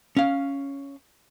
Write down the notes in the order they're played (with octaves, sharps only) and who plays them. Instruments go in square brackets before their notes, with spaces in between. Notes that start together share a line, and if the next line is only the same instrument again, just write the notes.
[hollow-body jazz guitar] C#4 F5